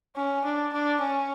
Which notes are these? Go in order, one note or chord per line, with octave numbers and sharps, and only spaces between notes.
C#4
D4
D4
C#4